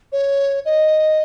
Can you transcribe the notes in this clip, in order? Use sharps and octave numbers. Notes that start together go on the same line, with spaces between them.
C#5
D#5